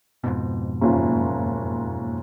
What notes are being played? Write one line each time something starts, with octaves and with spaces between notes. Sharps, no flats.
F2 G#2 B2
F#1 D#2 F4